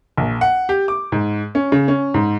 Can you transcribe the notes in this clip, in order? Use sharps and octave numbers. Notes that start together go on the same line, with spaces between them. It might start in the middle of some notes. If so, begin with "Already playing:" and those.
A#1
F#5
G4
D6
G#2
C#4
C#3
C#4
G#2